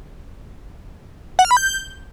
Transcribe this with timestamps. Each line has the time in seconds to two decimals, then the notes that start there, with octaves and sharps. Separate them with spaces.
1.39 F#5
1.45 F6
1.51 B5
1.57 G6